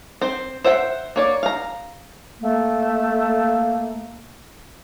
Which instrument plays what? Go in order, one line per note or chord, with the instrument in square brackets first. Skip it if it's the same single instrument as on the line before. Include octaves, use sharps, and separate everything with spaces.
[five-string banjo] C4 C5
C5 E5 F#5 G5
A#3 C#5 D5
F5 A#5
[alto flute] A3 [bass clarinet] A#3